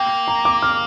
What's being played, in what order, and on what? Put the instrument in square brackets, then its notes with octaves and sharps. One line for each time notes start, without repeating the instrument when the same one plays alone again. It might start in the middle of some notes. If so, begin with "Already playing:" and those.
Already playing: [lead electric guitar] A#3 [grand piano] G5
[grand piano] A#5
D6
F6